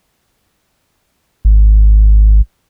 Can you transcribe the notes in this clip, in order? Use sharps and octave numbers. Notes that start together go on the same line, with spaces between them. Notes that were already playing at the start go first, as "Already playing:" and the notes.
G#1